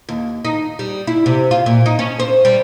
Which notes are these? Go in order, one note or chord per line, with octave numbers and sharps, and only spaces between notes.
D#2
D#4
G3
E4
C3
F4
A#2
D#4
C#4
C5
G3